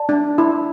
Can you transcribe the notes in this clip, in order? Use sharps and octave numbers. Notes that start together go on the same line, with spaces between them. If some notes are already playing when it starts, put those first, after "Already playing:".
Already playing: D5 A5
D4
E4